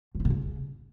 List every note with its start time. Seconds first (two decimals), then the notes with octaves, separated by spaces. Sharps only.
0.15 F3
0.20 E4
0.25 D3
0.30 C#3